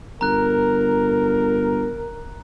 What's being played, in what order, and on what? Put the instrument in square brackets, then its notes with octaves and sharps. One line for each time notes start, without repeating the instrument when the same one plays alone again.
[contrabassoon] G1 [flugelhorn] A#4 [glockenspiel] A#5 F#6